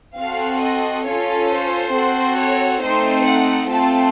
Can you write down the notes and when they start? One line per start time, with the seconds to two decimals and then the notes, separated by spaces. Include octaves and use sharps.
0.17 C4 F#4 A4 F5
0.61 D#5
1.05 C#4 F4 A4 C#5
1.49 C5
1.93 C4 F#4 A4
2.38 C#5
2.81 A3 C4 D#4 C5
3.25 F#5
3.69 A3 C4 F4 A5